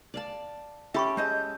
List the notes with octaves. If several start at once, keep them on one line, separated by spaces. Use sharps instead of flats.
D5 F5 A5
C#4 G4 A4 E5 G5 B5 C#6
G#3 D#5 A5 G6